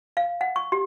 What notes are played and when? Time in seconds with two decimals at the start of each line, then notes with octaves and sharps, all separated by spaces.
0.17 F5
0.41 F#5
0.56 C#6
0.72 G4